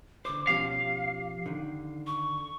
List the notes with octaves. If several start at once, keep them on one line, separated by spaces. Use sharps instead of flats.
D3 C5 D6
B2 F3 C#4 G4 F5
D3 D#3
C#6